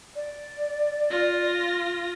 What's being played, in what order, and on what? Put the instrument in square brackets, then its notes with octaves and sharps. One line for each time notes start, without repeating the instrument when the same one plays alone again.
[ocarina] D5
[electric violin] F4 A#6